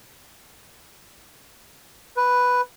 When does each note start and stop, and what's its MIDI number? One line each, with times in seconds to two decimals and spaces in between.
2.17 2.61 71